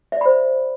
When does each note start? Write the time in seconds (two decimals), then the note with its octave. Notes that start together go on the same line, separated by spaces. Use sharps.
0.12 E5
0.17 D5
0.21 B5
0.25 C5